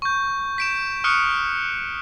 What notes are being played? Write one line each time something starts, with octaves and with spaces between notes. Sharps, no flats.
C#6 G6
B6 D7 E7
C#6 D#6 F6 F#6 C#7